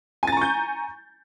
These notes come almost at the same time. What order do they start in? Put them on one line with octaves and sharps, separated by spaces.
G#5 A6 A#5 C#6 G6